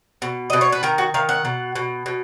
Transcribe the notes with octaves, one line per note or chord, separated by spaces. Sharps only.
B2
B2 D#5
C#5
B4
D#3 A#4
F#4
D#3 F5
F#5
B2
B2
B2